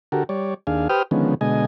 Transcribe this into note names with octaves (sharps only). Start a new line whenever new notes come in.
D3 F#4 G4 A4 A#4
G3 C#5 D5
D#2 D4 G#4 F5
G4 B4 C5 G5 D#6 F6
D3 D#3 F3 G#3 B3 C#4
B2 D3 G#3 D#5 G#5